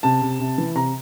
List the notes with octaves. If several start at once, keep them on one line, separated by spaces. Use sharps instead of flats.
C3 A5
C3
C3
E3
C3 A#5